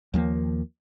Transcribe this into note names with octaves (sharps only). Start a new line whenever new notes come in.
D#2 F3 F#3 A#3